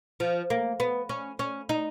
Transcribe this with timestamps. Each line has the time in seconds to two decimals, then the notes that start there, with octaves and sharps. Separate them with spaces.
0.20 F3
0.50 A#3
0.80 B3
1.09 C#4
1.39 C#4
1.69 D#4